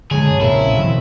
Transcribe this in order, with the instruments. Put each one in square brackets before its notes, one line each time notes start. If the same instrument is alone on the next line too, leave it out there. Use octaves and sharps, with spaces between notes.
[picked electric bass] D3 G#3 [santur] C#4 D#4 A5 [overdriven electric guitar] G#4
[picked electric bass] F#2 C3 [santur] A#3
[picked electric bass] A#1 A#2 C#3 [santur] C4 A#4 F5 [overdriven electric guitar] E4
[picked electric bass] B2 E3 F#3 [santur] A3 D#5